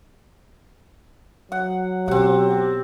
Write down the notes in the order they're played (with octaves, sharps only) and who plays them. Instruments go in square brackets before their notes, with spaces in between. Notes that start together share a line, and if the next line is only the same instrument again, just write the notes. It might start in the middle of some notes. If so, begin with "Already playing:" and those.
[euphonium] F#3 [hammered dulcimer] F#5
[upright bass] B2 [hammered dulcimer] C4 F#5 [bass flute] G4